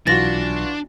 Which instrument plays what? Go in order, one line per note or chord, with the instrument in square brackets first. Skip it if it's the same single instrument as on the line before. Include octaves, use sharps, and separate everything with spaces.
[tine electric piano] B1 [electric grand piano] E3 F4 F#4 [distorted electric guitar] D4 [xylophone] A6 A#6